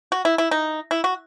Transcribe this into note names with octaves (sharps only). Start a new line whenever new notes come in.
F#4
E4
E4
D#4
E4
F#4